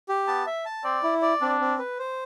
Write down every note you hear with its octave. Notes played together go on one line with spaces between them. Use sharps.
G4
B3 A5
E5
A5
C4 D5
E4
D5
C4 D4
C4
B4
C5